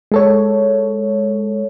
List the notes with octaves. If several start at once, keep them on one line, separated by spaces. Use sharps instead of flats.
G#3 A4 C#5